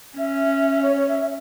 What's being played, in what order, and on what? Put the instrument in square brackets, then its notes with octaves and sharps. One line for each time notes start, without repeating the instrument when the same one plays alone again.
[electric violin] C#4 [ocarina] E5
[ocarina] E5
C#5
C#5
E5
E5